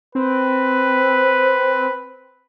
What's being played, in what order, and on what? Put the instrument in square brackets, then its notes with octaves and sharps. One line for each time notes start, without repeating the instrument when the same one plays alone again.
[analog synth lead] C4 [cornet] B4